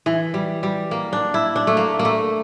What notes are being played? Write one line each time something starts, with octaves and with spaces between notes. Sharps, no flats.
E3
G3
G3
A#3
D4
E4
D4
A3
A#3
A#3
A3